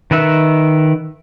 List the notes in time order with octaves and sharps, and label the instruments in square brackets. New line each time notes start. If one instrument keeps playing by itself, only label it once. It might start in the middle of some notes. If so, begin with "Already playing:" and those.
[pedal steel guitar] D#3 A#4 B4 E5 F#5